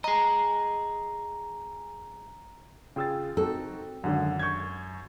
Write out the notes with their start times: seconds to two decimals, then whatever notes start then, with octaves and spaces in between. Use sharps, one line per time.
0.04 G#4 D#5 A#5
2.96 C#3 F4 G#4 G5 E6 A6
3.37 C4 D#4 F#4 A4
4.04 G#1 F#2 D3 F#5
4.39 C#6 G6 G#6